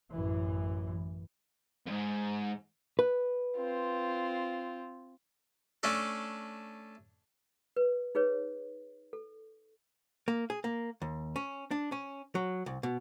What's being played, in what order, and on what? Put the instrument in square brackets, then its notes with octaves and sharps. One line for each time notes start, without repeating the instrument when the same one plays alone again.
[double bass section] A1 F#2 E3
[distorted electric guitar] F2 G#2
[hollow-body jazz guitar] B4
[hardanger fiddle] C4 F4
[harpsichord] A3 C#4 D4 A4
[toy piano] B4
D#4 G#4 B4 C#5
A4
[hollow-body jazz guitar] A#3
G#4
A#3
D#2
C#4
D4
C#4
F#3
C2
B2